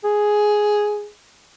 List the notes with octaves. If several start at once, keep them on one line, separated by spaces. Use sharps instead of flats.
G#4